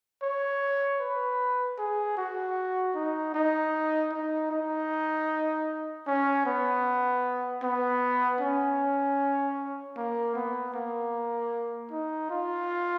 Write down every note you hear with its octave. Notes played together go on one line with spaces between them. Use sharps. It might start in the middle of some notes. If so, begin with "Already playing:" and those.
C#5
B4
G#4
F#4
D#4
D#4
D#4
D#4
C#4
B3
B3
C#4
A#3
B3
A#3
D#4
F4